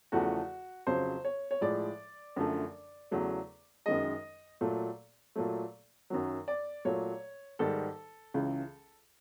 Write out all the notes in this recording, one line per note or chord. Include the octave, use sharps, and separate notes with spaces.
E2 C#3 F3 A3 F#4
F2 C#3 F#3 C5
C#5
C#5
A2 F3 G#3 D5
F#2 D3 F3 A3
E2 C#3 F#3 A3
F#2 D#3 G#3 D#5
A#2 F#3 A3
A#2 F#3 A3
F#2 D#3 F#3
D5
A#2 F#3 A3 C#5
G#2 D#3 G3 A4
C#2 C#3 E3